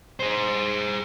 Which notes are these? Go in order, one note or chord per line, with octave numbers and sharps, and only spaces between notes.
G#4 C5